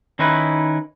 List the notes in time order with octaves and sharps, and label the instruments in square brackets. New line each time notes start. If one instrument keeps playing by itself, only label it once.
[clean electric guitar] D#3 C#4 D#4 E4 B4